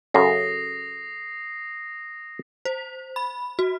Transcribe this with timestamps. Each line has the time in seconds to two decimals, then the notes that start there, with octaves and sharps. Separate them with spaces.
0.14 F#2 C#3 A4 D#6 A#6 C7
2.65 C5
3.16 B5
3.59 F#4